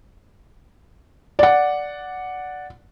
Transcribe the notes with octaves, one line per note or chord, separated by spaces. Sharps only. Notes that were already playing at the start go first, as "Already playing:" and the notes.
D5 F#5